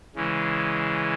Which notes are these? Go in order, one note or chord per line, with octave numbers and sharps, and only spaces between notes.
C#3 E3 G#3